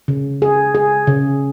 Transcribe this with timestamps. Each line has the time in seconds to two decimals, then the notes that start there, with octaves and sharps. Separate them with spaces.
0.08 C#3
0.42 G#4
0.75 G#4
1.07 C#3